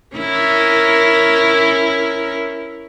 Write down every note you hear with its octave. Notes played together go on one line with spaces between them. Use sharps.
C#4 E4 A#4